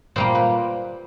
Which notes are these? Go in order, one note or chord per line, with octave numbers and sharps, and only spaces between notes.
A#2 G3 A#3 C5
B4